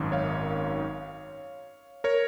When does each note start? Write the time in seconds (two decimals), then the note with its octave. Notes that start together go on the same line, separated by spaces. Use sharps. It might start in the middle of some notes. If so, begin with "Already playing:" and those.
Already playing: G#1 F#2 D#3
0.12 C#5 F5
2.04 A#4 C#5